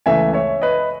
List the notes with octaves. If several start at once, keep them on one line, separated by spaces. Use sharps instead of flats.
C#2 C#3 E3 A3 E5 G#5
C#5 E5
B4 D#5